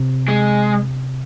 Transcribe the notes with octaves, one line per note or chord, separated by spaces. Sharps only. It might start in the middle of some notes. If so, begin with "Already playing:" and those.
Already playing: C3
G#3